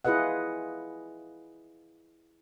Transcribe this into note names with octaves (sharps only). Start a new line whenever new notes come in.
E4 F4 G#4 B4 D#5 F#5